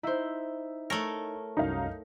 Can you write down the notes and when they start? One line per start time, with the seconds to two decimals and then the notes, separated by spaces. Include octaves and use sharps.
0.03 D#4 E4 C5 E5
0.90 A3 A#4 C#5 A5
1.57 C2 F#2 F#3 D#4 F5